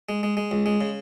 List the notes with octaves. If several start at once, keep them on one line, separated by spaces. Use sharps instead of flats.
G#3
G#3
G#3
C#2
G#3
C#3